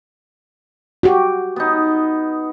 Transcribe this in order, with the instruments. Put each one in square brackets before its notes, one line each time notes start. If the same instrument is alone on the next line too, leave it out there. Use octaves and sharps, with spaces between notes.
[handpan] F#4 G4
[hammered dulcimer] B3 D#4